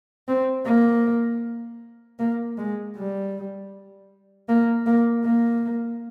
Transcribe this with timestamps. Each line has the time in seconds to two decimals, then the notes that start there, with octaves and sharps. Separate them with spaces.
0.28 C4
0.66 A#3
2.19 A#3
2.57 G#3
2.96 G3
4.49 A#3
4.86 A#3
5.24 A#3